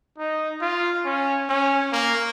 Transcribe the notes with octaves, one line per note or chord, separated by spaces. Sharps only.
D#4
F4
C#4
C#4
A#3